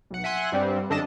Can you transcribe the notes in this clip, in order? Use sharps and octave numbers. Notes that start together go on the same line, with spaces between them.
B1 F#5
E5 F#5 G#5 C6 F#6
G2 G3 C4
F#2 D3 D4 A4 D#5 A5